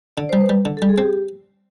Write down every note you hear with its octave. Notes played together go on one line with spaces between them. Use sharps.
D3 D5
G3 C5
B4
G3
D3
G3 A4
G#4
C4 G4